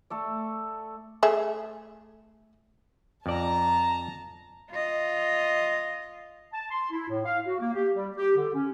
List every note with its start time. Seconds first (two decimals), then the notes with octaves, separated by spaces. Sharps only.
0.10 A3 A4 D5
1.23 A3 G#4 E5
3.26 F2 D5 A5 A#5
4.71 F4 D#5
6.53 A5
6.70 C6
6.91 E4
7.09 A2
7.25 F5
7.47 F#4
7.60 A#3
7.73 G4
7.95 G3
8.17 G4
8.36 D3
8.54 C#4